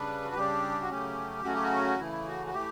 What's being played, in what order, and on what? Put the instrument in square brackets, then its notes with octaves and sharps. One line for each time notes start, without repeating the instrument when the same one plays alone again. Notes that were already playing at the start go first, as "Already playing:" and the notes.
Already playing: [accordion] C#3 G3 D4 B4
F#4
C#3 G3 D4 G4
F#4
C#3 F#3 A3 C#4 G4
C#3 F#3 A3 C#4 F#4
G4
F#4
C#3 E3 A3 E4
F#4
F#4
E3 A3 G4